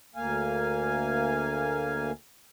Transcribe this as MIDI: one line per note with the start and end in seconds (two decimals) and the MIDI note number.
0.16 2.11 38
0.16 2.11 58
0.16 2.11 77
0.16 2.11 80